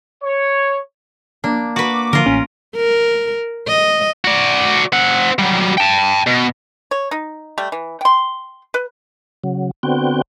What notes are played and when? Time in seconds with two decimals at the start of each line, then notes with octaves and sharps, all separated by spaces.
0.23 C#5
1.44 A#3 D4
1.76 F#4 B4 D6
2.13 D3 F3 F4 A#4
2.26 A1 C#4
2.76 A#4
3.68 D#5
4.25 F#4 D5
4.93 C4 F#5
5.39 F#3 G3
5.77 G5 A5
6.27 B2
6.91 C#5
7.11 D#4
7.58 G3 A3
7.72 E3
8.01 G5 C6
8.74 B4
9.44 C#3 F#3
9.83 D3 B3 C4 F#4 G5